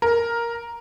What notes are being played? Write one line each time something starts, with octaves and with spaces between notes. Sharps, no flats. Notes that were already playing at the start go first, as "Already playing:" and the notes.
A#4